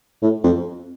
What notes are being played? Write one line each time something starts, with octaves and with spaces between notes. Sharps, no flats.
A2
F2